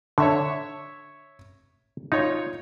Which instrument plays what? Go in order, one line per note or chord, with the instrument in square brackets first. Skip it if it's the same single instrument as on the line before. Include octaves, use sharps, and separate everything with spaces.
[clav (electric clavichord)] D3 [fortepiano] C#5 E5 C#6
[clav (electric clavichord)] D#4 [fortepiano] F4 C#5